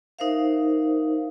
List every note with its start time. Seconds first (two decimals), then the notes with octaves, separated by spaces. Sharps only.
0.19 D#4 A#4 C5 E5 F5